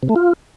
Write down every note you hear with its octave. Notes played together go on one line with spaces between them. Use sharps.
C3
A3
F4